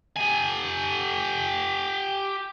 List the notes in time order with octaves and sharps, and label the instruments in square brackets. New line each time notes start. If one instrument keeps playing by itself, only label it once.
[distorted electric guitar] G4 G#5